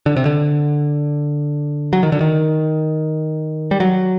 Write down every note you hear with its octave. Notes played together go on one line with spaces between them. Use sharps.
D3
C3
D3
F#3
D#3
D3
D#3
G3
F#3